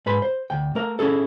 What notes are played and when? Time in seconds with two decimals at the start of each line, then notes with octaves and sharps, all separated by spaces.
0.06 G#2 B4 B5 C6
0.22 C5
0.50 D2 G5
0.75 A3 A#4
0.99 C#4 E4 G#4 A4